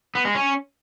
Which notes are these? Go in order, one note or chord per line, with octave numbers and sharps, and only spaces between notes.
B3
G#3
C#4